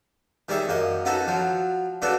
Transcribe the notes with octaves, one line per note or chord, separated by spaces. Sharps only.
D#3 G3 G#4 C#5 E5
F#2 A#3 D#5
B3 C#4 D#4 F#4 A4
F3 F#3
C#3 B3 D4 F#4 A4